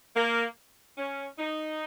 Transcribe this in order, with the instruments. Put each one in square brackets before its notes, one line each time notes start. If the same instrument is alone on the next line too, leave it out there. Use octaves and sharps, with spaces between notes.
[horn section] A#3
C#4
D#4